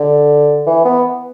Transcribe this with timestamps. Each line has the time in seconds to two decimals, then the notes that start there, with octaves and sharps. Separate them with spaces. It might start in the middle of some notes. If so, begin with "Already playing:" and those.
Already playing: D3
0.66 E3
0.85 B3